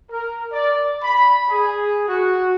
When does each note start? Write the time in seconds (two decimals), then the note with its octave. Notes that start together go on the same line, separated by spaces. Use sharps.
0.11 A#4
0.53 D5
1.03 B5
1.49 G#4
2.08 F#4